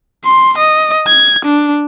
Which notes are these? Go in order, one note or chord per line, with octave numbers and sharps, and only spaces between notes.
C6
D#5
G#6
D4